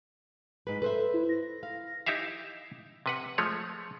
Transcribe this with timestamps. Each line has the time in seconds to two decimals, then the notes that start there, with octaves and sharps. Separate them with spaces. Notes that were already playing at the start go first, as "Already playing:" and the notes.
0.67 G#2 B4 B6
0.82 A4 B4 C5 E5
1.14 E4
1.29 A#6
1.63 F5
2.06 D#4 E4 G4 E5 F5
3.06 C3 B4 F#5
3.38 F3 G#3 A3 C#5